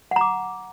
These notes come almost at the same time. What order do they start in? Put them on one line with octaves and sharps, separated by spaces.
F#5 A#5 D6